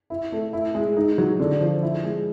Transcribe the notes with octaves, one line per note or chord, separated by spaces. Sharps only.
E4
A3
E4
G#3
D#4
F#3
D3
F3
E4
G#3